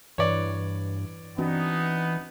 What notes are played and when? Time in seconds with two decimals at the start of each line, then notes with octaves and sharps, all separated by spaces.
0.18 G2 E3 B4 C#5 D5
1.38 E3 B3 C4 D4 D#4 F#4